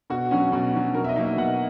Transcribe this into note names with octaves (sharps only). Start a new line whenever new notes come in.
B2 F#4
F#3 C#4 F#4
B2 F#4
F#3 C#4
B2 A#4
E5
D#5
F#3 A#3 D#4
E5
B2 F#5